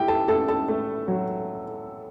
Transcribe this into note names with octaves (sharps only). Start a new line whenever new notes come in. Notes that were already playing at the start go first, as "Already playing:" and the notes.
Already playing: A3 E4 G4 G5
A4 A5
A3 A4 A5
A4 A5
A3
F#3